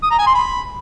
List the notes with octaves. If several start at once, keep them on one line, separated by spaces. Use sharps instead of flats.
D#6
A#5
G#5
C6
B5